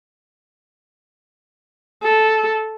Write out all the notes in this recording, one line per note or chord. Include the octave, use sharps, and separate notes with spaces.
A4